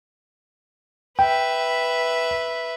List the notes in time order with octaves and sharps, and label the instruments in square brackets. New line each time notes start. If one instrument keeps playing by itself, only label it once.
[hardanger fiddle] B4 E5 [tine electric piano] G5